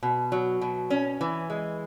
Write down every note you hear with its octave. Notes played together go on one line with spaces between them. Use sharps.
B2
F#3
B2
C#4
E3
G#3